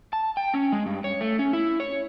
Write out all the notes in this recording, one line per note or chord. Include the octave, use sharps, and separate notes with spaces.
A5
G5
C#4
G#3
G2
C#5
A3
C#4
E4
C#5